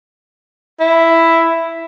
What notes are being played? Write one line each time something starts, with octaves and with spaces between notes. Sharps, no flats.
E4